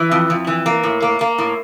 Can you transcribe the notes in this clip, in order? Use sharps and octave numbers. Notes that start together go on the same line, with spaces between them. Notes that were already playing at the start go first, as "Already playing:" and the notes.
Already playing: E3
F2
F2
E3
A#3
A2
A#3
A#3
A2